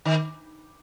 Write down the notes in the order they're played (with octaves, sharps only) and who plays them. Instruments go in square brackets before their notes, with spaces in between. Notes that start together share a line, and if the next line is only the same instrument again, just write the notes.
[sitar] D#3